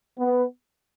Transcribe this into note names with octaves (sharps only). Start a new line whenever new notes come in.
B3